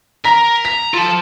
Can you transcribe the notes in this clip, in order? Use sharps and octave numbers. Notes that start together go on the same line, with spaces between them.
A#4 A#5 B6
A#5 B6
F4 A4 A5